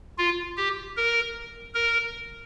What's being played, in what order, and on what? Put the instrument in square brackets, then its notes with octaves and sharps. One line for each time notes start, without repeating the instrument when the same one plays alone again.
[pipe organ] F4
G4
A#4
A#4